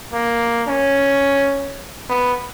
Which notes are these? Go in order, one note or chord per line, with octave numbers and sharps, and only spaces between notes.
A#3
C#4
B3